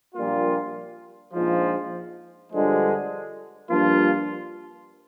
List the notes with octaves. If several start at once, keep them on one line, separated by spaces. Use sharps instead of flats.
A#1 A#2 G3 A#3 F4
A#1 G#2 F3
G2 D3 F3 G#3
G2 F3 A#3 D4 F4